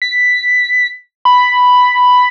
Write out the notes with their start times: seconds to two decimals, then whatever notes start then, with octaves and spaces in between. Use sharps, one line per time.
0.02 B6
1.25 B5